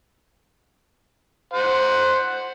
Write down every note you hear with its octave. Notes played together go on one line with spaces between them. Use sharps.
C5 F#5